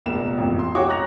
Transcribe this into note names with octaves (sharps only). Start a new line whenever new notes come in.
F1 A#1 A#3 B3 E7
A1 F2
C6
F#4 G#4 C#5 G5 C#6 D6
A#5 F#6 A#6 F7